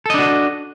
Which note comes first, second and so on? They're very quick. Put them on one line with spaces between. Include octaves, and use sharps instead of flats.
A4 D#5 D4 F#4